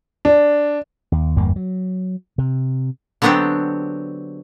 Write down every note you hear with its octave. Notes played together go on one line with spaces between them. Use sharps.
D4
D#2
G1 E2 G2 A#3
F#3
C3
D3 F#3 B3 C4 D4 G4